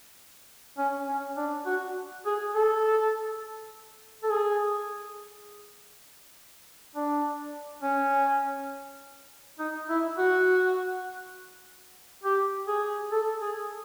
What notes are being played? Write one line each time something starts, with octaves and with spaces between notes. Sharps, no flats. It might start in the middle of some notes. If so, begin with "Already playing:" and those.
C#4
C#4
D4
F#4
G#4
A4
A4
G#4
D4
C#4
D#4
E4
F#4
G4
G#4
A4
G#4